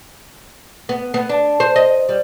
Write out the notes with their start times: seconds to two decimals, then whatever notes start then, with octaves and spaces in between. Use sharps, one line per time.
0.89 B3
1.14 B3
1.29 D4
1.60 C5
1.76 D#5
2.09 G3